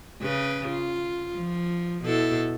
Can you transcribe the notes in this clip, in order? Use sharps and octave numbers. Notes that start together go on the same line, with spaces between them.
C#3 B4
F4
F3
B2 E4 A4